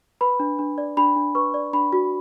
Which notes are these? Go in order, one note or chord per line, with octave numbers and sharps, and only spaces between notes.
B4 B5
D4
D4
D5
D4 B5
D4
B4 C#6
D5
D4 B5
F#4